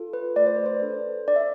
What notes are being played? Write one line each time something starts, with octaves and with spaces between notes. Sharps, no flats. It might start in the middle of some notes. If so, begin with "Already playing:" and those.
Already playing: F4 A4
B4
A3 D5
C5
B4
C5
D4 A4
D4 D5
E5